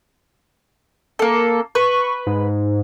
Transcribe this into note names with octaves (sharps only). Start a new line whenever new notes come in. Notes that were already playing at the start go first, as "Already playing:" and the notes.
A#3 A4
B4 C#6
G#2